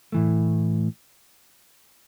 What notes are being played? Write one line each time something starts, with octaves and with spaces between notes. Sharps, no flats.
A2 E3 A3